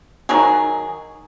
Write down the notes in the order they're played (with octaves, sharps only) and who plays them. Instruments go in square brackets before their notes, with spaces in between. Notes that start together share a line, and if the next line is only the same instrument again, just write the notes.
[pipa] D#3 F#3 G#4